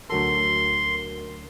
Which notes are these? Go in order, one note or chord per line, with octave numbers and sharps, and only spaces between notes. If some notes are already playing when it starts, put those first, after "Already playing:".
D2 F#3 A4 A#4 C6